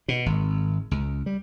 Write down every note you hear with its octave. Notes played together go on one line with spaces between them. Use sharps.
B2
G#1
C#2
G3